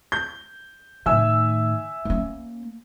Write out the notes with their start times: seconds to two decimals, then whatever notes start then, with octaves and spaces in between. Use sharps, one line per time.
0.12 G6
1.06 A2 D#3 E5 G#5 E6
2.05 A#3 C#4